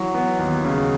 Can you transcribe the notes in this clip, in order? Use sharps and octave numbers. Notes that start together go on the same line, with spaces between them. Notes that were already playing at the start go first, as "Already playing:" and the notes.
Already playing: E3 F#3 C#6
B3
D#2
C#3